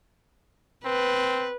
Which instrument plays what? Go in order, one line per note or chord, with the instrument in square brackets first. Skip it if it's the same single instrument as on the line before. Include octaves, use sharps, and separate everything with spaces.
[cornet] C4 [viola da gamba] B4